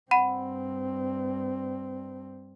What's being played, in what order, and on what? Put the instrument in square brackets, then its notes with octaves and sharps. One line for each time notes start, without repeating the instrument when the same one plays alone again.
[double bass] G2 C4 [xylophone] F#5 B5 D#7